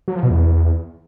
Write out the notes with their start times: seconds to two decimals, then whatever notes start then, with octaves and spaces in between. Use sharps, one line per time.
0.08 F#3
0.15 F3
0.23 B2
0.30 E2